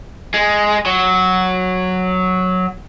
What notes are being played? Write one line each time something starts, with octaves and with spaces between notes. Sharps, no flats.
G#3
F#3